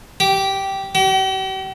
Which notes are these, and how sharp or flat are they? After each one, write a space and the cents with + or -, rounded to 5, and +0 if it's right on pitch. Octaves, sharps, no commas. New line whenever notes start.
G4 -10
G4 -45